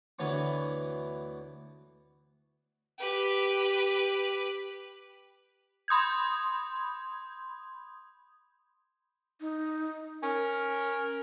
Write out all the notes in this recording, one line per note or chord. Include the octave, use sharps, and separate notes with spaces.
D2 E3 B3 C#5 G5 C#6
G4 B4
B5 C6 D#6 G6 G#6
D#4
C#4 A#4